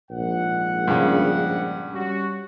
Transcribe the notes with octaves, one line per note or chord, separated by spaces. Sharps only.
A#1 G#2 F#5
G2 C#3
G3 C#4 F#4